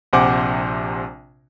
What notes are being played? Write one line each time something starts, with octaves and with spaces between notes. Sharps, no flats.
A#1 C3 C5 F#5 G#5 D6